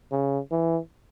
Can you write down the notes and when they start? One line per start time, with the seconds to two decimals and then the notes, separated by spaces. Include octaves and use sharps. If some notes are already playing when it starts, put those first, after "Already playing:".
0.12 C#3
0.51 E3